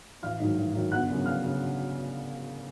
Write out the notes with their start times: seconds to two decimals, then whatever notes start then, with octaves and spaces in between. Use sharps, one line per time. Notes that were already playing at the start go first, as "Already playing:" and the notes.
0.23 A1 F5 F6
0.40 G#2 D#3 F#3
0.58 A1
0.75 G#2 D#3 F#3
0.92 G1 F#5 F#6
1.09 F#2 C#3
1.26 G1 F5 F6
1.43 C#3